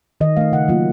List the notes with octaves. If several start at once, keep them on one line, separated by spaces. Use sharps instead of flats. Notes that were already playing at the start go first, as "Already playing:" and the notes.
D#3 D#5
A3 D#4 F5
C#3 F#5
F#3 A#3 F4